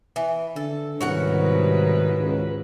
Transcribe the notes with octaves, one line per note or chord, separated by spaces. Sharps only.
E3
D3 A4
C2 G#2 D#3 C#4 F#4 B4 F#5
C#2